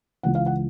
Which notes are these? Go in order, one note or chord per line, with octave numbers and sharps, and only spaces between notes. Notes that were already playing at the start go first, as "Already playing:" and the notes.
C#2 C#3 E3 F#5
F5
F#5